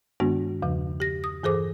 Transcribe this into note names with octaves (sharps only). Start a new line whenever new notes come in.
G2 D#3 G#3 B3 D4 F#4
E2 C#3 F3
G4 A#6
D#6
G2 E3 G#4 A4 C5 D6